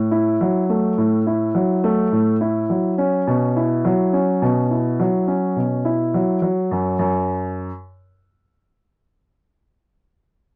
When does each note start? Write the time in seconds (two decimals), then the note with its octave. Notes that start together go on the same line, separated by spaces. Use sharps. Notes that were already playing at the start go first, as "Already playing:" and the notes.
Already playing: A2
0.11 E4
0.41 F#3
0.69 A3
0.98 A2
1.27 E4
1.55 F#3
1.84 A3
2.12 A2
2.41 E4
2.70 F#3
2.98 C#4
3.27 B2
3.56 E4
3.85 F#3
4.13 C#4
4.42 B2
4.71 E4
5.00 F#3
5.27 C#4
5.56 B2
5.85 E4
6.14 F#3
6.42 F#3
6.71 F#2
6.99 F#2